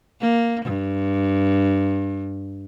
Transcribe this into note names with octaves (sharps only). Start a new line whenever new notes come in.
A#3
G2